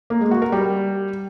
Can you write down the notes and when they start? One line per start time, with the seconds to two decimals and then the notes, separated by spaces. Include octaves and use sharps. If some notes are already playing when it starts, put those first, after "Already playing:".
0.10 A#3
0.21 G#3
0.31 F#4
0.42 A#4
0.52 G3